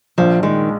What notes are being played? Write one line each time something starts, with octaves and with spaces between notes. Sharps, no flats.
A#1 F3
D#3 G#3